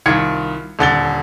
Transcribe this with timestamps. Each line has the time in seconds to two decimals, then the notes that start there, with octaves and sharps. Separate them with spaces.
0.06 C2 D#3 F4 G#6 C#7
0.79 D#1 D3 A6 G7